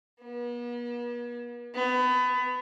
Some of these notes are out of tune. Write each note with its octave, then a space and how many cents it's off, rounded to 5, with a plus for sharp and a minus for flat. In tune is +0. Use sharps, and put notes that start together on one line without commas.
B3 -45
B3 +25